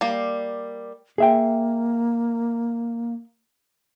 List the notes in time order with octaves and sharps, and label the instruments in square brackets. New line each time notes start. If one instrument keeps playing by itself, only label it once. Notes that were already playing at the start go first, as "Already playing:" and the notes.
[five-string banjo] G3 A#3
[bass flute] A#3 [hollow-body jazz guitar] G#4 E5 G5